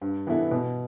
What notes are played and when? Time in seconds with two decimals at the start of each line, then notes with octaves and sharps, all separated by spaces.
0.01 G2
0.27 E3 B3 E4 A4
0.51 B2